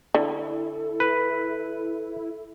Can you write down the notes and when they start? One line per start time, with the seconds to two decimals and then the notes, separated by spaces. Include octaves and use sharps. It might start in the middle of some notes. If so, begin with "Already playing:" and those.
0.15 D3 E4 A4
1.00 B4